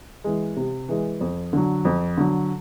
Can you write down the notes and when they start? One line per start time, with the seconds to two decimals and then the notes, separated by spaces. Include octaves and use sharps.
0.24 E3 G#3
0.56 C3
0.89 E3 G#3
1.21 F2
1.53 D3 F#3
1.85 F2
2.17 D3 F#3